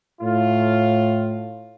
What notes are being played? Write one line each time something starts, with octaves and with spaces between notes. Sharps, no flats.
A2 F4